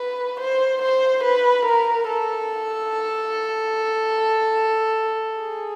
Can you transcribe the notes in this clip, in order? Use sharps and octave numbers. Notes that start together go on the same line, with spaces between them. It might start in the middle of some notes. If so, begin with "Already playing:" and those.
Already playing: B4
C5
C5
B4
A#4
A4
G#4